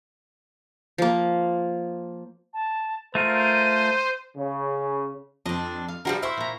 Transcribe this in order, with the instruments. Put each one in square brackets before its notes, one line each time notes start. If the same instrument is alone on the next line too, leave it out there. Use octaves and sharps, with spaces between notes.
[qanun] F3 A#3
[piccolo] A5
[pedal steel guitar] A3 F4 A#4 [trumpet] C5 [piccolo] D#7
[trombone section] C#3
[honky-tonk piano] F2 [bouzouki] C4 D4 [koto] D#5
[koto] F5
[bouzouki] E3 F3 G3 [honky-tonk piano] D4 F#4 [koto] A#4
[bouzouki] E4 C5 E5 [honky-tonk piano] C#6 E6
[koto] A#2 A#5